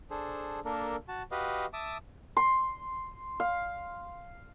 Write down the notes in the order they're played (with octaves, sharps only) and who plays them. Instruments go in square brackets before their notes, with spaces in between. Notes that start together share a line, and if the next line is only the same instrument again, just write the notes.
[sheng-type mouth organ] D4 G#4 A4 C5
A#3 D4 A4 A#4
F#4 A5
F#4 G4 B4 D#5 F5
E5 A5 D6 D#6
[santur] C6
F5